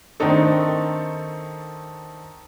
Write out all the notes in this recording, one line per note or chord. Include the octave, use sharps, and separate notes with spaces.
D#3 A3 C4 D4 D#4 A4